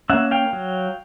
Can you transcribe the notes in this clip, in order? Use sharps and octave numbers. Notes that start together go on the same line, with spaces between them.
A#3 C#4 E5 F#5
F5 G5
F#3